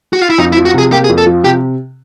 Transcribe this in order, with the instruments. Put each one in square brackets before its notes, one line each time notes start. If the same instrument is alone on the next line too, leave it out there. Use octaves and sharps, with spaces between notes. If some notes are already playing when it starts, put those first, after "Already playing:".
[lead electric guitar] F#4
F4
E4
[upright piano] F2 [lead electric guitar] D#4
[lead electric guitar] E4
[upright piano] F3
[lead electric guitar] F#4
[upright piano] C3 [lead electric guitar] G#4
[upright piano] A#3 [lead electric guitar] G4
[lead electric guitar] G#4
[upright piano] F2
[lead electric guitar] A4
[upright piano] F3
[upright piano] C3 [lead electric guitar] G4